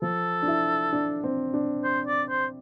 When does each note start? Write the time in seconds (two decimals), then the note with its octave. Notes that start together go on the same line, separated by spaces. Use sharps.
0.02 F3 A4
0.42 D4
0.48 E4
0.93 D4
1.24 C4
1.54 D4
1.84 C5
2.07 D5
2.30 C5